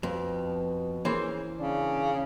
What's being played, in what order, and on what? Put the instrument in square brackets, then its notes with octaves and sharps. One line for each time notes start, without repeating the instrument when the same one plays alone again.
[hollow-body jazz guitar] F2 [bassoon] B2
[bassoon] C#3 [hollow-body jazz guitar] E3 A#3 C5
[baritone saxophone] C#3 [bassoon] D4